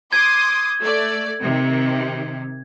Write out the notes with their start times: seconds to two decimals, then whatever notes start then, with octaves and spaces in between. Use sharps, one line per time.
0.13 C6 D6 D#6 G#6
0.80 A3 D5
1.40 C3 D#3